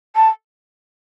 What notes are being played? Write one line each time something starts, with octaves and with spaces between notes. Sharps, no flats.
A5